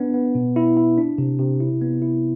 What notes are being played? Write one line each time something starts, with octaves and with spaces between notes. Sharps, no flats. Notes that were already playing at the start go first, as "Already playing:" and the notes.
Already playing: B3 D4
B3
B2
E4
E4
D4
C3
C3
E4
B3
E4